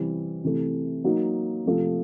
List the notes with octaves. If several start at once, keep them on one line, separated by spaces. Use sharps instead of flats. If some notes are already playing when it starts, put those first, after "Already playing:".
Already playing: C3 E3 G3 C4
C3 E3 A3
F#3 A#3 D#4
C3 F3 A3